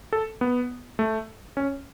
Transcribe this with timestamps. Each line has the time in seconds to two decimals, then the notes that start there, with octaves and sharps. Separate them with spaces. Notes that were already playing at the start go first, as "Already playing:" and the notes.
0.13 A4
0.41 B3
0.99 A3
1.57 C#4